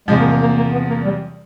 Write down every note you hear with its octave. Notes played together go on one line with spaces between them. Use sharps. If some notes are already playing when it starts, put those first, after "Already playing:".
E2 C3 F3 G#3
A#3
A#3
A#3
A#3
B3
A#3
G3